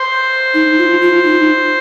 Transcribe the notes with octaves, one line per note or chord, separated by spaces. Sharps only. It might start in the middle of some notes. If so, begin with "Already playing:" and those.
Already playing: C5
D#4
F4
F4
D#4